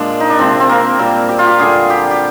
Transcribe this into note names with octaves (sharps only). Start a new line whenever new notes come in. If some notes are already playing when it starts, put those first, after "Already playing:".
Already playing: A#2 F3 G#3 D4
D#4
D4
C3 F3 G#3 C4
C4
A#3
A#2 G3 C4
G4
F4
G4
D3 G3 G#4
G4
G4